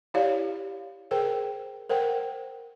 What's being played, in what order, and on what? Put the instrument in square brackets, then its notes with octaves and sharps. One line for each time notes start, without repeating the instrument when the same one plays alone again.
[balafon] E4 G4 C#5 D5 F5
G#4 A#4 C5 G5
A#4 C5 F#5 G5